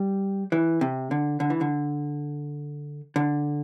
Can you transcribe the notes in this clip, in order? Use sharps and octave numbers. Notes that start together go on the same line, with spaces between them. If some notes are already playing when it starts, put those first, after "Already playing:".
Already playing: G3
E3
C3
D3
D3
E3
D3
D3